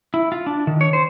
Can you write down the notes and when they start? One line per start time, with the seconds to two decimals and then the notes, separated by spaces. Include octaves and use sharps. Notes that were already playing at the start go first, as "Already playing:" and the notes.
0.14 E4
0.32 F4
0.47 D4
0.67 D#3
0.81 C#5
0.93 C5